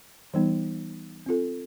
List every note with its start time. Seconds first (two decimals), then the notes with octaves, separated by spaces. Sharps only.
0.34 E3 G3 B3 D#4
1.26 C4 F4 A4